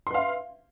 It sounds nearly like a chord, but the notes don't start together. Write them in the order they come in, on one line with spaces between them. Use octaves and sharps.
C6 B4 F5 E5